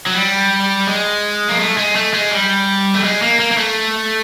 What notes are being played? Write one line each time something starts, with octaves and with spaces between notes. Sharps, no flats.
F#3
G3
G#3
A#3
A3
G#3
A3
G#3
G3
A3
G#3
A#3
A#3
A#3
A3